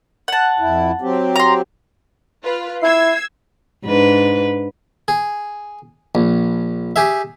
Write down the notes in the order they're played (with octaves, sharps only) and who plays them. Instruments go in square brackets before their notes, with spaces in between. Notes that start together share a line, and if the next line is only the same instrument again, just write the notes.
[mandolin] F#5 A5
[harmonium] F2 E4
F#3 C4 G4
[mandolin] A#5 C6
[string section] F4 B4
[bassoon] E4 [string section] E6 G#6 C7
[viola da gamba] G#2 D4 B4
[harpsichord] G#4
A#1
G4 G#4 E5